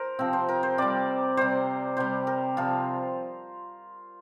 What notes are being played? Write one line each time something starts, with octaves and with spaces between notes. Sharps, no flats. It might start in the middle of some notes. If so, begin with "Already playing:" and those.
Already playing: A#4 C5
C3 F3 C4
C5
A#4
C5
C3 G3 D5
C3 G3 C5
C3 G3 C5
A#4
C3 F3 F4